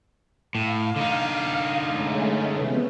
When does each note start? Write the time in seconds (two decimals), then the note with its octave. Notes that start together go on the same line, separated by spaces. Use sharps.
0.55 A2 F5
0.96 D3 D#4
1.87 G#3 A3 C#4
2.51 C3 E3 B3